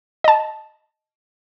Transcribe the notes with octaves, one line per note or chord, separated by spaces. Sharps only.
D#5 A5